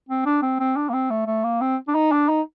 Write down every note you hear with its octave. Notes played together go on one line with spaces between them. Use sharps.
C4
D4
C4
C4
D4
A#3
C4
A3
A3
A#3
C4
D4
D#4
D4
D#4